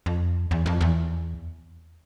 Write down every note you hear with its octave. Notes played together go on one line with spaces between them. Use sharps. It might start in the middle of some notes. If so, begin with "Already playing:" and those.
F2
E2
F2
E2